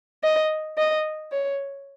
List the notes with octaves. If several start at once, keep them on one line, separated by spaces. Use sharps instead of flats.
D#5
D#5
C#5